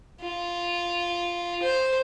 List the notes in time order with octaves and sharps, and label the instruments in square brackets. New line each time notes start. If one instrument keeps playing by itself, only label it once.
[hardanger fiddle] F4
C5